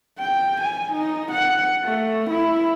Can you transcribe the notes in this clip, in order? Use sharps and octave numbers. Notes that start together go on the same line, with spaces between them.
G5
G#5
D#4
F#5
A3
E4